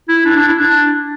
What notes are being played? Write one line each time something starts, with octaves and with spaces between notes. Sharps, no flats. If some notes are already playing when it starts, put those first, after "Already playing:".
E4
D4
D4
E4
D4